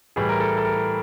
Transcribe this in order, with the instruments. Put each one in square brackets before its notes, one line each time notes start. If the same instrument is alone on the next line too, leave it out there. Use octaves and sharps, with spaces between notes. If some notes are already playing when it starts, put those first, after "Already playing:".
[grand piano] A2 E3 G3 G#4
A#4
A4
A4
A#4